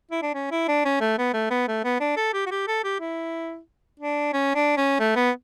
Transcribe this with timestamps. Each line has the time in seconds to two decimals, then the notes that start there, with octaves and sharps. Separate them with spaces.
0.11 E4
0.22 D4
0.34 C#4
0.51 E4
0.68 D4
0.85 C#4
1.01 A3
1.18 B3
1.34 A3
1.51 B3
1.68 A3
1.84 B3
2.00 D4
2.17 A4
2.34 G4
2.46 F#4
2.51 G4
2.68 A4
2.84 G4
3.00 E4
4.00 D4
4.33 C#4
4.55 D4
4.77 C#4
5.00 A3
5.16 B3